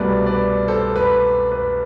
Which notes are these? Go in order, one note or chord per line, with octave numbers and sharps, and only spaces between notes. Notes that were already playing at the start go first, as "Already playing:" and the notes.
Already playing: C2 B2 A3 B4 D5
B4 D5
A4 C5
B4
B4